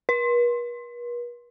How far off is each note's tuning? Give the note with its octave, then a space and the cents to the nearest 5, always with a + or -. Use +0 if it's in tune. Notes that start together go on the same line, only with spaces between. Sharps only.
B4 -45